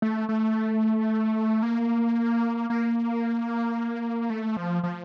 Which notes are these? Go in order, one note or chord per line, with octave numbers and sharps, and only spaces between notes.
A3
A3
A#3
A#3
A3
F3
F3